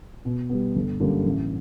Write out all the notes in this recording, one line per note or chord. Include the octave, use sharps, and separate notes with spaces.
B2
G3 B3
G1
F#2 D3 G3 A#3
A1